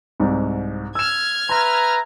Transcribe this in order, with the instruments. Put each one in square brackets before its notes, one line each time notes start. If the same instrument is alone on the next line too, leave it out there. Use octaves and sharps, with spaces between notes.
[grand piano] C2 G#2
[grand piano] E6 E7 [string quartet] F6 G#6
[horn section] B4 E5 A#5 [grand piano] C6